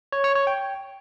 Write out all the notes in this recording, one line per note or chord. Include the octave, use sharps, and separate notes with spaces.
C#5
C#5
C#5
G5